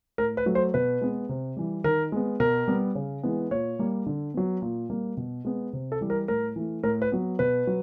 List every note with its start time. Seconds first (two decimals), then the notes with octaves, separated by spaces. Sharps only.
0.18 A2 A#4
0.37 B4
0.46 F#3 A3
0.55 C5
0.74 B2 B4
1.01 G#3 B3
1.29 C3
1.57 E3 G3
1.84 D#3 A#4
2.12 G#3 B3
2.40 B2 A#4
2.68 G3 B3
2.95 C#3
3.23 E3 G#3 B3
3.51 A#2 C#5
3.79 G3 A#3
4.06 D3
4.34 F#3 B3
4.62 A#2
4.90 G3 A#3
5.17 B2
5.45 G#3 B3
5.73 C3
5.92 A4
6.01 E3 G3
6.10 A#4
6.28 A2 A#4
6.56 E3 A3
6.83 A2 A#4
7.02 B4
7.12 F#3 B3
7.39 B2 B4
7.67 F#3